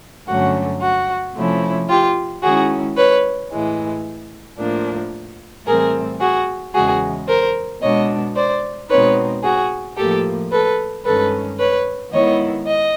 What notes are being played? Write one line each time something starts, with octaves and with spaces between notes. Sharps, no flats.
G2 D3 F#3 A3 C#4 F#4
F#4
C3 F3 A3 C#4 E4
F4 G4
D#3 G#3 C#4 E4 F#4 G#4
B4 C#5
A2 E3 G#3
A2 F3 A#3 D4
A2 E3 G3 C4 G#4 A#4
F#4 G#4
E2 C#3 E3 G#3 F#4 G#4
A#4 C5
B2 G#3 B3 D4 C#5 D#5
C5 D5
B2 G#3 C4 D#4 B4 C#5
F#4 G#4
A2 F3 A#3 G4 A4
A4 B4
G2 D#3 G#3 C#4 A4 B4
B4 C#5
D#3 G#3 B3 E4 C#5 D#5
D#5